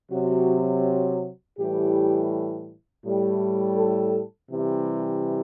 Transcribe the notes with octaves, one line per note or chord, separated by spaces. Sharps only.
C3 F#3 F#4
A2 E3 G3 G4
A2 G3
A4
C3 E3 G3